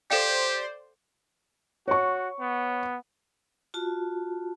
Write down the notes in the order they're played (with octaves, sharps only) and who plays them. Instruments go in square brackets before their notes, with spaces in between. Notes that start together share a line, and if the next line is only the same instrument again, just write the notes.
[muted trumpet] G4 [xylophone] A4 F5 G5 [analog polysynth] C5 D5
[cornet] F#4 [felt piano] C#5 C#6
[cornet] B3
[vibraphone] F4 F#4 A5